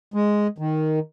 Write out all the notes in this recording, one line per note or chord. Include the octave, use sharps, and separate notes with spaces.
G#3
D#3